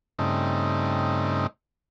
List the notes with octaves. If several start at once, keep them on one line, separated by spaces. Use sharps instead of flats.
G2 C#3 A3 C4 D#4